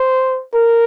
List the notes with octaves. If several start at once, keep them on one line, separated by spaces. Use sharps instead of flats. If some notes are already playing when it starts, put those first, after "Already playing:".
Already playing: C5
A#4